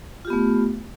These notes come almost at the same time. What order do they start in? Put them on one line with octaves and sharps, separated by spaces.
F4 G4 B3 A3